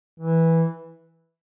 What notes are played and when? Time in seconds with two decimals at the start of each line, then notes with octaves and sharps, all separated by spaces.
0.20 E3